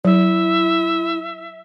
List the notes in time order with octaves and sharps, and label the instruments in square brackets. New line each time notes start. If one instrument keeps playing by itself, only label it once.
[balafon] F#3 [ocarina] E4 [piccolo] E5